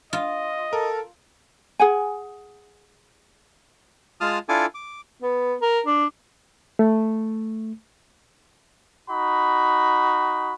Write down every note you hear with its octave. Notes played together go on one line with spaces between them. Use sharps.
F4 D#5
A4 A#4
G#4 F#5 G#5
G#3 F4 A5 D#6 F6
D4 E4 F4 A4 G#5 D6
D6
B3
A#4
D4
A3
D#4 F#4 B5